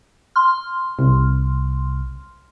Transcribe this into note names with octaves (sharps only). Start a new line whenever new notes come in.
C6 F6
C2